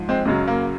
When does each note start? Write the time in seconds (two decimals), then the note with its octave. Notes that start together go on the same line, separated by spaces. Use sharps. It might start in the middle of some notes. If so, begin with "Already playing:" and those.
Already playing: G#2 F3
0.09 G#3 C4
0.25 F#2 C#3 F#3 G#3
0.48 A#3